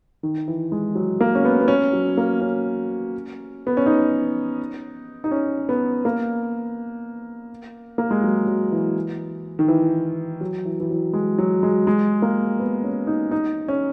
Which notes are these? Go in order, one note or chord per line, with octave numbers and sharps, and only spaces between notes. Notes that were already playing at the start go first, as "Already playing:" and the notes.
D#3
E3
G#3
F#3
A#3
C#4
B3
B3
C#4
F#3
A#3
C#4
B3
C#4
D#4
D#4
C#4
B3
A#3
A#3
G#3
F#3
F#3
E3
D#3
E3
F#3
E3
E3
F#3
G#3
F#3
G#3
G#3
A#3
B3
C#4
D#4
D#4
C#4